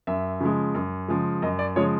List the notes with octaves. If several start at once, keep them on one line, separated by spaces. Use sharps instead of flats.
F#2 E5
C#3 F3 G#3
F#2
C#3 F3 G#3
F#2 D#5
D5
C#3 F3 G#3 C#5